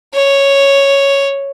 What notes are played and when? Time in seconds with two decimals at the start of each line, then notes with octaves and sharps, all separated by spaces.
0.14 C#5